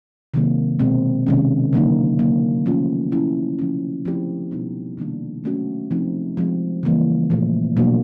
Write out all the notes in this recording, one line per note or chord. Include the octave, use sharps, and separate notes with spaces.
C3 D#3 F#3 A#3
B2 G#3 C4
C3 D#3 G#3 C#4
D3 F#3 A#3 D#4
D3 F#3 A#3
F3 A3 C#4 F4
F3 A#3 C#4 E4
C#3 F3 A3 C#4
F3 A3 C4 E4 G4
B2 G3 B3 D#4
C3 D#3 G3 A#3 D4
F#3 A3 C#4 F#4
C3 F3 A3 C4 D#4
F3 G#3 C4
C#3 E3 G3 A#3
A#2 F3 A3
B2 F#3 A#3 D4 F#4